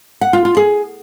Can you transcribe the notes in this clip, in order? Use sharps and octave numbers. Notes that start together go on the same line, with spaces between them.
F#5
F4
F4
G#4